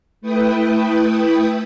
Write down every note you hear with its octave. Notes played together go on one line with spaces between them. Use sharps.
A3 E4 B4 G5 D#6